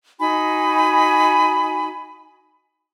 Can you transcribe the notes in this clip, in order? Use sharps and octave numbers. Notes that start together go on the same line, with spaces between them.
D#4 F#4 G#5 B5